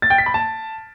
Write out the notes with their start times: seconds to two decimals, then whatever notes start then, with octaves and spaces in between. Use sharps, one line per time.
0.02 A6
0.10 G5
0.18 B6
0.26 B5
0.34 A5